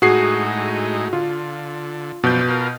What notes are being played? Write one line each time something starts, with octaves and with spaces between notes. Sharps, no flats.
A2 G#3 D#4 F#4 G#4 C7
D3 F4
F#2 B2 F3 D4 B4 G6
F4 A#4